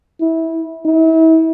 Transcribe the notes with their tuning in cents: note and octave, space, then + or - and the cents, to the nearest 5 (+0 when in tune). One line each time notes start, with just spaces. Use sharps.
E4 -20
E4 -35